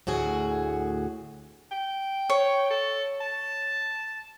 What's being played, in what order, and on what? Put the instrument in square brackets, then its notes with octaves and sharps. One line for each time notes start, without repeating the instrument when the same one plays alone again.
[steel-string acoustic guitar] D2 A2 F#4 G#4
[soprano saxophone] G5
[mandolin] C#5
[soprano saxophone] A4
A5